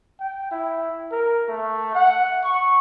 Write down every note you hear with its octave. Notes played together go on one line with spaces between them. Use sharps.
G5
E4
A#4
A3
F#5
C#6